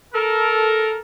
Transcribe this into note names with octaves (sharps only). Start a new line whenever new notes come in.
A4 A#4